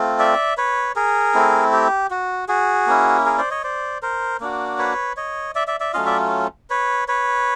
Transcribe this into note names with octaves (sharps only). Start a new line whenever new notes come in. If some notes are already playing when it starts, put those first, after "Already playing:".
Already playing: A3 C4 F4
D5 E5
B4 C#5
G#4 A#4
A3 C4 E4
G4
F#4
F#4 G#4
A#3 C#4 E4
G#4 A#4
C5 D5
C#5 D#5
C5 D5
A#4 C5
A#3 D4 F#4
B4 C#5
C#5 D#5
D5 E5
D5 E5
D5 E5
F#3 A3 C#4 F4 D#5 F5
D5 E5
B4 C#5
B4 C#5